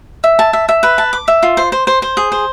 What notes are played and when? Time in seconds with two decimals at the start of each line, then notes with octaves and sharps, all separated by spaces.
0.24 E5
0.39 A5
0.53 E5
0.69 E5
0.83 B4
0.98 A5
1.13 D6
1.28 E5
1.43 F4
1.57 C5
1.72 C5
1.87 C5
2.02 C5
2.17 G#4
2.32 C5